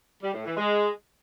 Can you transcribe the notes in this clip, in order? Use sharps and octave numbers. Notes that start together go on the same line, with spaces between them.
G3
A2
E3
G#3